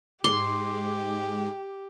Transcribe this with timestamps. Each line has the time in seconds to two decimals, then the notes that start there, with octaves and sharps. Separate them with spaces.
0.24 G#2 G#3 G4 C6 D6